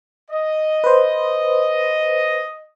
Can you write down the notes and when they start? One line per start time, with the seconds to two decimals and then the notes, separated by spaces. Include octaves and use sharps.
0.31 D#5
0.84 B4 C5